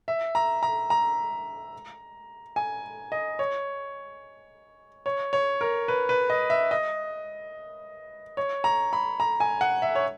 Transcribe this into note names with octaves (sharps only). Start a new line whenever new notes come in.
E5
A#5
A#5
A#5
G#5
D#5
C#5
C#5
C#5
A#4
B4
B4
D#5
E5
D#5
C#5
A#5
B5
A#5
G#5
F#5
E5
C#5